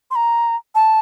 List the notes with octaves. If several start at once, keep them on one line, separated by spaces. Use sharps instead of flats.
C6
A#5
A5